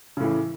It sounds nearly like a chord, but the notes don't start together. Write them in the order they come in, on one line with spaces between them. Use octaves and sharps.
C#3 A2 E3